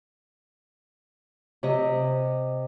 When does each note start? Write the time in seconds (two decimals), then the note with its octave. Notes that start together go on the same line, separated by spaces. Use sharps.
1.63 C3 G4 D#5